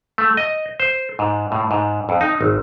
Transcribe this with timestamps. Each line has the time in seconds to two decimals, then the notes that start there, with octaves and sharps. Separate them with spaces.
0.18 A3
0.37 D#5
0.80 C5
1.19 G#2
1.52 A2
1.71 G#2
2.09 F2
2.21 D#4
2.41 G#1